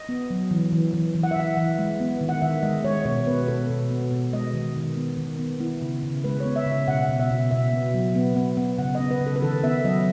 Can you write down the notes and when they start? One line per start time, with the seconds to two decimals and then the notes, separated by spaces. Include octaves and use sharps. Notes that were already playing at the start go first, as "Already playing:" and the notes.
Already playing: D#5
0.09 B3
0.30 F#3
0.51 E3
0.72 E3
0.94 E3
1.15 E3
1.23 F#5
1.31 E5
1.36 E3 F#5
1.57 E3
1.79 G#3
2.00 B3
2.21 D#3
2.29 F#5
2.42 D#3 E5
2.63 G#3 D#5
2.84 G#3 C#5
3.05 B2 C#5
3.27 B3 B4
3.48 B2 A4
3.70 B2
3.90 B3
4.12 B2
4.33 G#3 D#5
4.54 D#3
4.76 D#3
4.97 B3
5.17 D#3
5.39 B3
5.60 B3 E4
5.82 C#3
6.02 C#3
6.24 G#3 B4
6.40 B3 C#5
6.56 E5
6.66 C#3
6.72 E5
6.88 B2 F#5
7.09 B2
7.20 E5
7.30 B2
7.51 B2 E5
7.73 B3
7.94 F#3
8.15 B3
8.36 B3
8.57 B3
8.78 C#3 F#5
8.95 B3 D#5
9.11 B4
9.21 C#3
9.27 A4
9.36 B4
9.42 D#3 A4
9.64 B3 E5
9.85 F#3 D#5